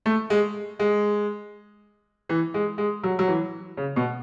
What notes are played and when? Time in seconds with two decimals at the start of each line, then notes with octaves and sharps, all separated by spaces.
0.06 A3
0.30 G#3
0.79 G#3
2.29 E3
2.54 G#3
2.78 G#3
3.04 F#3
3.19 F#3
3.28 E3
3.77 C#3
3.96 B2